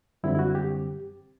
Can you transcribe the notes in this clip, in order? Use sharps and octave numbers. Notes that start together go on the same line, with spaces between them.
F#2 D3 G3 C4 E4
E4
F#4
G4